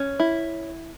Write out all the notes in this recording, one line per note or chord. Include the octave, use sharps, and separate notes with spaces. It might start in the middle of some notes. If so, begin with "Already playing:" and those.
Already playing: C#4
E4